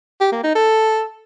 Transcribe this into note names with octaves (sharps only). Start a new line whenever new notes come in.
G4
A#3
D#4
A4